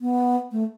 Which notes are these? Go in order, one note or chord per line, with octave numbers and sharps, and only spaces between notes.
B3
A3